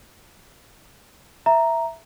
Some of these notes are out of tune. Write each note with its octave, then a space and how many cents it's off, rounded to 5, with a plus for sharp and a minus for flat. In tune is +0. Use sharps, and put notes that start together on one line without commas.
E5 +0 A#5 +0